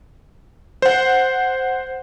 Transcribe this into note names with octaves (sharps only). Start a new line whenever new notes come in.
C5 F#5